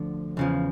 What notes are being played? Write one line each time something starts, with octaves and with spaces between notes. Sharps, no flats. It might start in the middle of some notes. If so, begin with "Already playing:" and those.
Already playing: D2 D3 F3
E2 C#3 F3